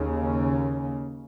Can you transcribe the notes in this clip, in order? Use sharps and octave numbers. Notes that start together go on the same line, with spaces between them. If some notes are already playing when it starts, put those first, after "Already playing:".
Already playing: D#2 C#3